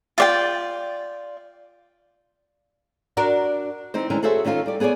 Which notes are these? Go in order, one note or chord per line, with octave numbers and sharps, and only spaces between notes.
F4 D5 G5
D4 F#4 A#4
E3 C4 D#4 C5
D#3 E3 G#3 C#4 D4 A#4
F#4 G#4 A4 C5 C#5 E5
D#3 C#4 D#4 F4 A4
G3 D5
B3 G#4 C#5 D5 G#5